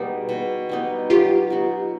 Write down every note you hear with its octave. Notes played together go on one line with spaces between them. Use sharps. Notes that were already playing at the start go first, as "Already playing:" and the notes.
Already playing: B2 G3 B3 D#4 G#4
B2
G3 B3 D#4
F#3 F4 G4
B3 D#4 F#4